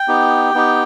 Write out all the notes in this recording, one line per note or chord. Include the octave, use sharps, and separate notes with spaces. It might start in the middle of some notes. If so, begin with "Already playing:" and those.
Already playing: G5
B3 D#4 G4
B3 D#4 G4